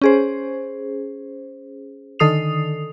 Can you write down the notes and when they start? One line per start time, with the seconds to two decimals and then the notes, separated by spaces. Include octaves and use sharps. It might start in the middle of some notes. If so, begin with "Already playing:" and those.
0.01 C#4 G#4 C5
2.19 D3 D#3 A4 D#6 C7 F7